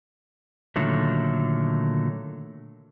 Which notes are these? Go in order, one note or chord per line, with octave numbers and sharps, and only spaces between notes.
A#2 D3 D#3 F#3 A3